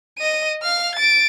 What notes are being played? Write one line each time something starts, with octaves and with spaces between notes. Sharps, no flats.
D#5 D#7
F5 F6
A6 D7